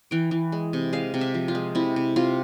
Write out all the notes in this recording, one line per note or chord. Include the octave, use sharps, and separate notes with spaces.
E3 G5
E3
G#3
C3
G#3 F5
C3
E5
F3
F4
G#3
C3 E4
C3
C3 F4